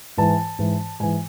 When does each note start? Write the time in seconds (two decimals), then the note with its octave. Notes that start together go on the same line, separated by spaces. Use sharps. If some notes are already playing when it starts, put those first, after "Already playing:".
0.17 G#2 E3 A5
0.59 G#2 E3
1.00 G#2 E3 G#5